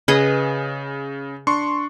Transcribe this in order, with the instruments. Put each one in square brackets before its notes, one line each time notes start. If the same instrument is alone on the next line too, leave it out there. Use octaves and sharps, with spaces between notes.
[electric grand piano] C#3 [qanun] G#4 B4 D#5
[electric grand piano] D4 C6 C#6